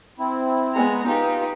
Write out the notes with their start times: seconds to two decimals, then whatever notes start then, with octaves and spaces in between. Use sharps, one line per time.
0.19 C4 E4
0.73 G#3 B3 A#5
1.07 D#4 F4 G4 B4